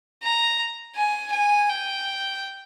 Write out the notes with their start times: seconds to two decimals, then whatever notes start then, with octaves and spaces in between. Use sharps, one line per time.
0.23 A#5
0.96 G#5
1.32 G#5
1.69 G5